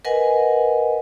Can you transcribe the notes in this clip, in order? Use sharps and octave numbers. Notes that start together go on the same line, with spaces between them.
A#4 B4 D#5 F#5 G#5